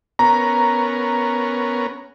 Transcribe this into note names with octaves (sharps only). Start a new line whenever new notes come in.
B3 C#4 A#4 A#5